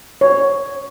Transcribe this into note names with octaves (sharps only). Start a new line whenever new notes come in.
C#5